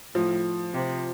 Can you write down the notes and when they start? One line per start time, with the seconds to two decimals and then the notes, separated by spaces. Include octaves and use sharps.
0.14 A2 F3
0.73 C3